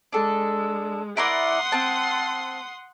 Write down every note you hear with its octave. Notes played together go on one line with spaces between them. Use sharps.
G#3 D4 A4
E4 A#4 D5 F#5 C6 D#6
C4 A5